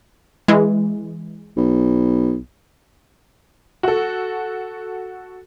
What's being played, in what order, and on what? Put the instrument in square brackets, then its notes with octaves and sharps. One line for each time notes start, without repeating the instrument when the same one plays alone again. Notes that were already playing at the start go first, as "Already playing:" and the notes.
[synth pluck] E3 G#3
[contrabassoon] B1
[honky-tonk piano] F#4 A4